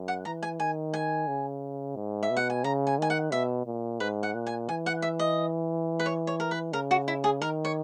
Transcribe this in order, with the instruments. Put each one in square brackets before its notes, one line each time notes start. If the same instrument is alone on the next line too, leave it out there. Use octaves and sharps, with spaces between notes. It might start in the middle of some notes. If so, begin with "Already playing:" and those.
Already playing: [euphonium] F#2
[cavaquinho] F#5
[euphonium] E3 [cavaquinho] A#5
[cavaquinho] G#5
[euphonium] D#3 [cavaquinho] G#5
[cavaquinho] G#5
[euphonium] C#3
G#2
[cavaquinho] E5
[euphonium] B2
[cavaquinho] F#5
G#5
[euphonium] C#3 [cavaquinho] A#5
[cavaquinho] G#5
[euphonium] D#3 [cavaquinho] G#5
[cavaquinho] F#5
[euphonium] B2 [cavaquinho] E5
[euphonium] A#2
[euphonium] G#2 [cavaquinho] B4
[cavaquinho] F#5
[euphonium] A#2
[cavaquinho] G#5
[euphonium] E3 [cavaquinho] G#5
[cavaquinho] F#5
E5
D#5
B4
C#5
C#5
A#4
B4
[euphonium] C#3 [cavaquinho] A#4
[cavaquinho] F#4
E4
G#4
[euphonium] D#3 [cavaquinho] A#4
[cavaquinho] C#5